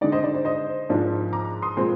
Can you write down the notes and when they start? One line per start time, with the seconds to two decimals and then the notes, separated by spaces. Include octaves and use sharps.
0.01 D3 G#3 D#4 D5
0.12 C5 D#5
0.24 D5
0.34 C5
0.45 C5 D#5
0.89 G#2 F3 A#3 D4
1.33 A#5 D6
1.62 C6 D#6
1.77 A#2 F3 G#3 C4